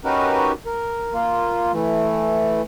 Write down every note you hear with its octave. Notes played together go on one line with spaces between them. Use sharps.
C#4 D#4 F#4 G4 A#4 B4
A#4
A#3 F4
E3 A3